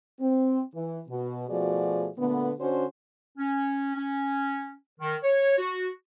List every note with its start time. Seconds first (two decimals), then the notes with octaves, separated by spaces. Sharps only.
0.21 C4
0.74 E3
1.09 B2
1.49 B2 F3 A3 F#4 G#4 D5
2.18 A#2 D3 A3 B3
2.60 D3 C#4 D4 F#4 C5
3.37 C#4
3.95 C#4
5.00 D#3
5.23 C#5
5.58 F#4